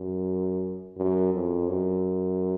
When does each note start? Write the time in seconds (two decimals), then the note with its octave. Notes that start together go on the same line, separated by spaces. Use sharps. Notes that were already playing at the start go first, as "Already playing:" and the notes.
Already playing: F#2
0.97 F#2
1.33 F2
1.69 F#2